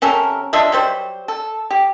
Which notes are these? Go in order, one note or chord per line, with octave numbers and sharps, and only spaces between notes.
C3 C#4 A4 A#4
D4 F4 D#5 E5
F#3 G3 C5
A4
G4